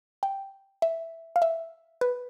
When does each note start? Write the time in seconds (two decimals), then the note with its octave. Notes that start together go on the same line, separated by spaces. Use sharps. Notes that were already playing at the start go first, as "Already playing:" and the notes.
0.23 G5
0.82 E5
1.36 F5
1.42 E5
2.01 B4